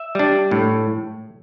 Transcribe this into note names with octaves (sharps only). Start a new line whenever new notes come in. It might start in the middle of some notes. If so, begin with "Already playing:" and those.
Already playing: E5
G3 D4
A2